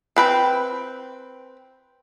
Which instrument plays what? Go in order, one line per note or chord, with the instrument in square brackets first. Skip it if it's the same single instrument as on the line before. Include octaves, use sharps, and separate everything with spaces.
[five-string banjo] C4 B4 G5